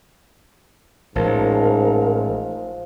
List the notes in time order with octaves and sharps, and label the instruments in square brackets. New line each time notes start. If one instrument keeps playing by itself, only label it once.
[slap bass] A1 [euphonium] G#2 [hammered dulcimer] F3 [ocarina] A#4